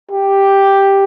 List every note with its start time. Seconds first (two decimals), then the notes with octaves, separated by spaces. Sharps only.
0.11 G4